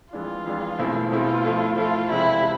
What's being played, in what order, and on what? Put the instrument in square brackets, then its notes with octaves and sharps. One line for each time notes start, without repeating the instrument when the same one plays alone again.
[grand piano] F2 E3 G#3 D4 [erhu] F4
[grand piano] F2 E3 G#3 D4
B2 A3 C4 E4 G#4
[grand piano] B2 A3 C4 E4 G#4 [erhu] F4
[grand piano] F3 A3 E4 A4
[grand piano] F3 A3 E4 A4 [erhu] F4
[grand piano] E2 C3 F3 G#3 [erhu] E4
[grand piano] C3